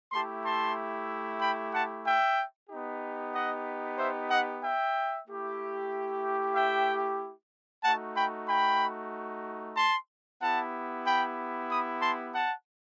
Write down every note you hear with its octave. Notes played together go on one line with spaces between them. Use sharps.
A3 E4 G4 A5 C6
A5 C6
G5 B5
F#5 A5
E5 G5
B3 D#4 G4
D#5 F#5
C5 E5
D#5 F#5
E5 G5
A3 E4 G4
E5 G5
A3 D#4 F#4 F#5 A5
G5 B5
G5 B5
A5 C6
B3 E4 G4 F#5 A5
G5 B5
B5 D#6
A5 C6
F#5 A5